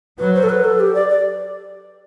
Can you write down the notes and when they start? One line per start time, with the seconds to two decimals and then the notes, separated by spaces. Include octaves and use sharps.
0.19 F#3 B4
0.34 C5
0.43 A4
0.49 B4
0.64 A4
0.80 G4
0.95 D5
1.09 D5